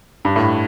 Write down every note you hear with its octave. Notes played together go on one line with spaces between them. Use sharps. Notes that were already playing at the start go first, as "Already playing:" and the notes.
G2
A2